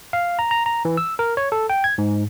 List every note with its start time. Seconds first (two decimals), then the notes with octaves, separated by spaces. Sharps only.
0.13 F5
0.39 A#5
0.51 A#5
0.66 A#5
0.85 E3
0.97 E6
1.19 A#4
1.37 C#5
1.52 A4
1.70 G5
1.84 G#6
1.98 G#2